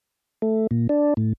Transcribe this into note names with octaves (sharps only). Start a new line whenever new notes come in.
A3
A#2
D4
A2